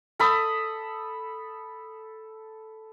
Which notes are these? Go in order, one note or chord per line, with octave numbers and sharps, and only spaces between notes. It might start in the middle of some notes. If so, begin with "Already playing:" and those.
A4 B5 D#6